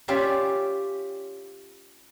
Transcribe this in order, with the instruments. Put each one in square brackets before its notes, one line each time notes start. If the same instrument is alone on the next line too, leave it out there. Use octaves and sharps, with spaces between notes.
[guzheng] C#4 F4 G4 D5 E5